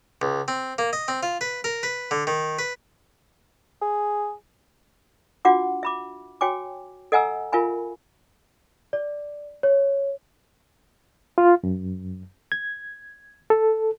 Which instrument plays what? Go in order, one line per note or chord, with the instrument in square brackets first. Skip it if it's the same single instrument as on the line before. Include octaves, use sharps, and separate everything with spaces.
[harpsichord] C#2
C4
A#3
D#5
C4
F4
B4
A#4
B4
D3
D#3
B4
[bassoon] G#4
[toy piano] D4 F4 F#4 F#5 D6
E5 B5 D6
F#4 C#5 G5 G#5 D6
A4 D#5 F#5 G#5 A#5 E6
F4 A#4 E5 F5 G#5 B5
[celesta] D5
C#5
[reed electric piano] F4
F#2
G#6
A4